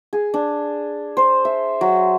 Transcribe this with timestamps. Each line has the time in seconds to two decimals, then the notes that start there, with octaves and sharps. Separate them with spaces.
0.13 G#4
0.34 D4
1.17 C5
1.45 E5
1.81 F#3